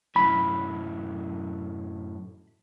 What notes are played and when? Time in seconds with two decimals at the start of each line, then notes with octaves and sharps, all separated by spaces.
0.16 F#2 A2 B5